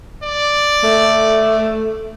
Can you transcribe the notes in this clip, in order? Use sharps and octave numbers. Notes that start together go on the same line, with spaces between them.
D5
A3